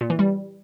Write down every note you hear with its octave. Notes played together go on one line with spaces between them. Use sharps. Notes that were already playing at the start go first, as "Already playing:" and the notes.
A#2
E3
G3